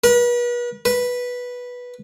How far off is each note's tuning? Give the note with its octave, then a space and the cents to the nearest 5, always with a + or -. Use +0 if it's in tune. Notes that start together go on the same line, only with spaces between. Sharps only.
B4 -40
B4 -10